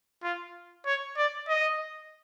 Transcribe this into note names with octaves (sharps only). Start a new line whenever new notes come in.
F4
C#5
D5
D#5